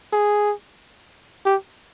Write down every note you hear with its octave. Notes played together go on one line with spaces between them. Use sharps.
G#4
G4